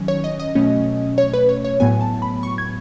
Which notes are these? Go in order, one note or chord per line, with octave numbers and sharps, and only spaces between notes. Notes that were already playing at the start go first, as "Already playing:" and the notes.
Already playing: D#3 F#3 C#4
C#5
D#5
D#5
B2 F#3 A3 C#4
C#5
B4
C#5
C#5
A2 F#3 B3 G#5
A5
B5
C#6
G#6